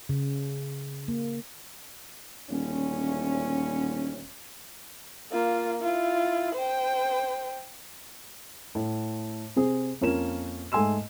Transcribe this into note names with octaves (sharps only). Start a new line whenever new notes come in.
C#3
A#3
D#1 D2 C#4
A#3 F4
E4 F4
C5 G5
A2
C3 C4 G#4
F2 A#3 C#4 F4 E7
G#2 A3 G#5 C6 E6 E7